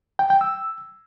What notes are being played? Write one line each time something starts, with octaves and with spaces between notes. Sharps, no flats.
G5
G5
E6